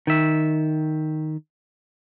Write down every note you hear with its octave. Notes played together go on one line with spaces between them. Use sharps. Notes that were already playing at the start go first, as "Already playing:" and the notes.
D#3 E5